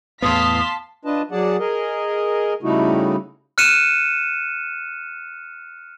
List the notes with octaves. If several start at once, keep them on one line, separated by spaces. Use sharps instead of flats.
E2 A2 B3 F5 A5 C6 D#6 B6
D4 F4 B4 D#5 A5
F#3 G#4 D5 F#5 A5
G#4 A#4 D#5
C#3 G3 A3 D#4 E4 F#4
F6 F#6 C#7 D#7 E7